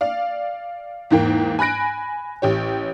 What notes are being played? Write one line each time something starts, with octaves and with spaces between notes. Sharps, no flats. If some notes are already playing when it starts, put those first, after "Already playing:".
D5 F5
E2 G#2 A#3 G5
G#5 B5 F#6 A#6 D7
A1 G4 C#5